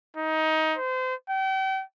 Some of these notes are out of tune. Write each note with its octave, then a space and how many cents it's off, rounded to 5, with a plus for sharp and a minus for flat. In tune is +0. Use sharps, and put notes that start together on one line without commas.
D#4 +20
C5 -30
G5 -40